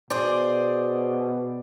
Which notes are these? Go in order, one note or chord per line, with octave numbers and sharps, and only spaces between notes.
B2 G#4 C5 D5